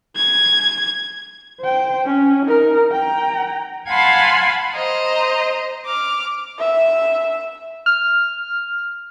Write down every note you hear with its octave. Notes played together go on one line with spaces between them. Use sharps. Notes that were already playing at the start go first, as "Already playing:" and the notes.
G#6
C5 G5
C#4
D#4 A#4
G5 A#5
F5 F#5 G#5 A5 B5 C6
C5 D#5 A#5
D6 F6
E5
F6